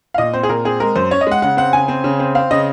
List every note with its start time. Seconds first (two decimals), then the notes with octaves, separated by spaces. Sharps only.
0.14 F5
0.18 A#2 D#5
0.33 C4 C5
0.43 G#4
0.49 A#2 A#4
0.65 C4 G#4
0.80 G#3 A#4
0.95 F#2 C5
1.11 C#4 C#5
1.21 D#5
1.27 G#3 F#5
1.42 C#3 F#5
1.57 C4 F#5
1.73 C#3 G#5
1.88 C4
2.04 C#3
2.19 C4
2.35 C4 F5
2.51 C#3 D#5